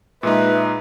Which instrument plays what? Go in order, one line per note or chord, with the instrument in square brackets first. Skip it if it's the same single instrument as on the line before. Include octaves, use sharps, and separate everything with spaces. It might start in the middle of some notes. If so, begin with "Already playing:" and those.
[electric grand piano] A#2 G#3 D#4 [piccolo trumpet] B4 [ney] E5